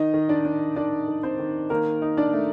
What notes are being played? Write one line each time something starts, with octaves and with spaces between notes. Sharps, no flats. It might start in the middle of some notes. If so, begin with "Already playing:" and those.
Already playing: D#3 D#4 D#5
D#3
D4 D5
D4
D#3 D4 D5
D#3
C4 C5
D#3
D#3 A#3 A#4
D#4
D4 D5
A3